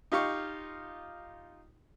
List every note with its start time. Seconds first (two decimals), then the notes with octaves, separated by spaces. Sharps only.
0.12 D#4 F4 G4 F5 C#6